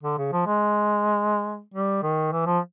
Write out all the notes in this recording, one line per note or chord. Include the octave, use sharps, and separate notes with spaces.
D3
C#3
F3
G#3
G3
D#3
E3
F3